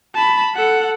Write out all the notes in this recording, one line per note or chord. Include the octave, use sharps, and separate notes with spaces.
A5 B5
A4 F#5